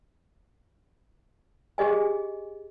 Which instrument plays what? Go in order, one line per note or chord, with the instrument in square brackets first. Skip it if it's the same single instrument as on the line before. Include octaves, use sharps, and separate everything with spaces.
[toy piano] G4 G#4 D#5 G#5